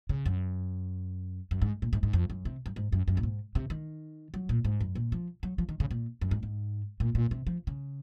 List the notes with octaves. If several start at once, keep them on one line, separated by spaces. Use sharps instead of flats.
C#3
F#2
F#2
G#2
A#2
G#2
G#2
F2
F#2
C3
F#2
G#2
F#2
F#2
A#2
G#2
C3
D#3
F#3
A#2
G#2
F#2
A#2
F3
F#3
F3
D#3
C#3
A#2
F#2
G#2
G#2
A#2
A#2
C3
F3
C#3